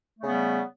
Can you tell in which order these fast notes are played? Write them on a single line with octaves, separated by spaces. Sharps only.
A3 C#3 B3 G3